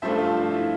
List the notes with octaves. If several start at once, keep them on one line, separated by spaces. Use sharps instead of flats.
G2 F3 A3 D4 C5 E5
F4
F4
E4